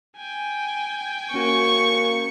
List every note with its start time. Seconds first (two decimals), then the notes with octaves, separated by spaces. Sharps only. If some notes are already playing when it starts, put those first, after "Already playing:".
0.17 G5 G#5
1.34 A#3 C#4 F#4 C#6